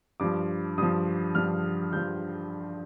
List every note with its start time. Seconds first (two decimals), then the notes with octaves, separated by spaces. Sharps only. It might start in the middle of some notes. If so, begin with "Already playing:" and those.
0.20 G2 F3 D6
0.78 G2 F3 D#6
1.35 G2 F3 F6
1.93 G2 F3 G6